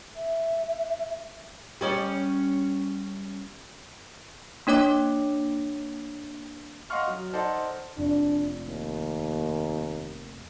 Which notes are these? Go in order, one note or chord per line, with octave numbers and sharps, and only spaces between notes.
E5
G3 C#4 D5
A#3 D4 C#5 D6
D#5 F5 F#5 C6 C#6 F6
F#3
D#4 A4 C5 D5 F#5
F1 D4
D#2